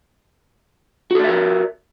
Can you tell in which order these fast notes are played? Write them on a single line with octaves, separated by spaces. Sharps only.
F#4 A4 D5 E5 A#4